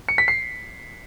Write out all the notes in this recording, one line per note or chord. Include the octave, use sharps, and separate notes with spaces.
C#7
B6
C7